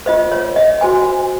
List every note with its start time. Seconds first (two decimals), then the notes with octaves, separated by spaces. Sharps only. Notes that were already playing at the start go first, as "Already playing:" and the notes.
0.06 F4 C5 D#5
0.32 C#5
0.56 D#5
0.81 F#4 C5 G#5